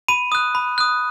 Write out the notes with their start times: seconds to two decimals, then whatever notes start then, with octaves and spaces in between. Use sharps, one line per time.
0.08 B5 D#7
0.32 D#6 F#6
0.55 B5
0.78 D#6 F#6